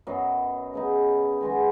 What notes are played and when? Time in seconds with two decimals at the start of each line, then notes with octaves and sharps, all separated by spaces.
0.07 F#2 F#3 B3 D#4
0.74 C#3 B3 D#4
1.41 D#3 G#3 B3 F#4